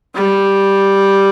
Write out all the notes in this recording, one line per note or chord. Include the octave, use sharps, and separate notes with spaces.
G3